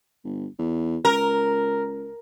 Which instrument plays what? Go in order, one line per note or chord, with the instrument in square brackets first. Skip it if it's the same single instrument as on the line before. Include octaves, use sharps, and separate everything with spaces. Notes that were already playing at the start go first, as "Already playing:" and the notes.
[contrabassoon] G1
E2
[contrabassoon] C#2 [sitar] A#4